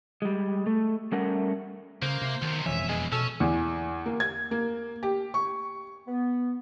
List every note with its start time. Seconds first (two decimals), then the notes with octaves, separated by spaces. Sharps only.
0.22 G3 G#3
0.66 A3
1.12 G3 A3 C#4 A#4 F#5
2.02 C#3 A#3 C5
2.22 C3
2.42 B1 C3 D#3
2.66 E1 F2 E3 C#4 E5
2.89 B2 G#3
3.12 B2 C#4 A4
3.40 E2
4.06 A#3
4.20 G#6
4.51 A#3
5.03 G4
5.34 C#6
6.07 B3